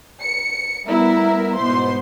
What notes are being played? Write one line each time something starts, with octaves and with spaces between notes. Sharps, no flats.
C#7
G3 A3 B3 E4 A#4 E5
G#2 B2 B3 C5 C6